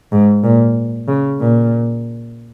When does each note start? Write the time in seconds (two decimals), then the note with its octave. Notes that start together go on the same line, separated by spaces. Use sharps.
0.12 G#2
0.44 A#2
1.08 C#3
1.40 A#2